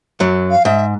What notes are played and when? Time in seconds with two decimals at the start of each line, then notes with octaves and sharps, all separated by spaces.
0.20 F#2 F#3
0.50 F5
0.65 G#2 E5